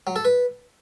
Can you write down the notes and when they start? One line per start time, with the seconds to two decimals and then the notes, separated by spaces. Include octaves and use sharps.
0.07 F#3
0.16 A4
0.25 B4